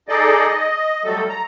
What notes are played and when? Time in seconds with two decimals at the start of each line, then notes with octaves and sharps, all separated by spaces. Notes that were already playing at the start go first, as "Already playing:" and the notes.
0.09 D#4 G#4 A4 D5 D#5
0.48 D#5
1.04 F#3 G3 A3 A4
1.29 A#5